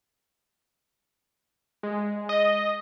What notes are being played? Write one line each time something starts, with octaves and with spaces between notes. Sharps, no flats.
G#3
D#5